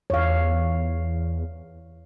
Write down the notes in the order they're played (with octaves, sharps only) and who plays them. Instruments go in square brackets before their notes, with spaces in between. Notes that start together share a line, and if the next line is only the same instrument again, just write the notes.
[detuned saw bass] E2 [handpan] C#5 F5